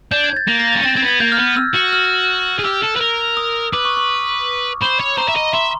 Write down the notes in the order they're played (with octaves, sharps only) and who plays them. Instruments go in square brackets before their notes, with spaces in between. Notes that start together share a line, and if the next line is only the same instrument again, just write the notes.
[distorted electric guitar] D4 [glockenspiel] G6
[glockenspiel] G#6
A6
[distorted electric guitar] A#3 [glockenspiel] A#6
[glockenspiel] A#6
A6
[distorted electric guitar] C#4
[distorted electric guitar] C4 [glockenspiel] A6
[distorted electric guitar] C4 [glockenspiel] G#6
[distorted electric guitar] B3
[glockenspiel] G#6
[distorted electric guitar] A#3 [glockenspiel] G6
[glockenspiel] F6
[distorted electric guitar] B3
[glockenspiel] E6
[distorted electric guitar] F#4
[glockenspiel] F6
[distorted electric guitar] G#4
[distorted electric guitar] G4 [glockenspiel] E6
[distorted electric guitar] A4
B4
A#4
[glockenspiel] D#6
[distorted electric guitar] B4 [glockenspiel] D6
[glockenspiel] C#6
C#6
[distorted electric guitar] C5 [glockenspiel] B5
[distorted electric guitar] C#5
[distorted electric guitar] C5 [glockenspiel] A#5
[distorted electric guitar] E5
D#5
[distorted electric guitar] E5 [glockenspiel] C6